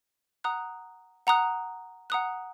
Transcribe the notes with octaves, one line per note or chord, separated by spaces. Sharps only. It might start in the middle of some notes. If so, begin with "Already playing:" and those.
F#5 A#5 D#6 F#6
F#5 A#5 D#6 F#6
F#5 A#5 D#6 F#6